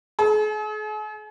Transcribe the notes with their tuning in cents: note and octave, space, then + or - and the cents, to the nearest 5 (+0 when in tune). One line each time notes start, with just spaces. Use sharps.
G#4 +45